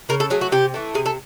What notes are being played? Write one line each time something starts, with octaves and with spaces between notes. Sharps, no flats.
C#3 A#4
A4
F#3 A3 G#4
F#4
C3 G4
E3 A3
C3 G#4
A4